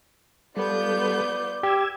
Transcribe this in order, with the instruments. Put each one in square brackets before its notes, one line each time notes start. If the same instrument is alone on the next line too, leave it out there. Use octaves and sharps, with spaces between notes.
[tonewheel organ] G3 A4 [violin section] B3 F4 G6 [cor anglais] D5
[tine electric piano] G4 [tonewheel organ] E6 G#6